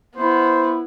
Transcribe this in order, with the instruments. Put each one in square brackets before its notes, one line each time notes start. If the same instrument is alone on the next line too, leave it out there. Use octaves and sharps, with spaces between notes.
[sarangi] B3 [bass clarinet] E4 [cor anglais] C5